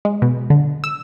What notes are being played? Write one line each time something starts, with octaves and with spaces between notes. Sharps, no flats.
G#3
B2
D3
E6